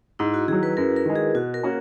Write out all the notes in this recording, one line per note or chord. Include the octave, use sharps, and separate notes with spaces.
G#2 E4
F#4
D#3 F#3 G#4
B4
F#2 A#4
A#4
D#3 G#3
G#4
B2 F#4
A#4
A#3 C#4 F#4